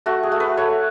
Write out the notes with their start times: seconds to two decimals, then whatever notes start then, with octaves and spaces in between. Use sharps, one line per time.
0.06 A3 F#4
0.23 G#4
0.32 A3
0.40 B4
0.57 A3 C#5